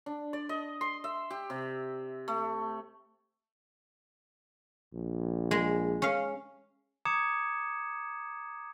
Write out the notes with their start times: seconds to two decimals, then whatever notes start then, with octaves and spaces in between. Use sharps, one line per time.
0.06 D4
0.33 D5
0.49 D#5
0.81 C6
1.04 E5
1.30 G4
1.50 C3
2.28 A3
4.94 A#1
5.51 G#3
6.02 C#4 F5
7.05 A#5 D6 D#6 G#6 C#7 E7